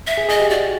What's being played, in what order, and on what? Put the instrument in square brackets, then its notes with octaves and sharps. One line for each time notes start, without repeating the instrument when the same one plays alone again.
[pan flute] E5
[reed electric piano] G#4
[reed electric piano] G#4 [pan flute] D#5
[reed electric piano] G4
[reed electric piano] F#4 [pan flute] D5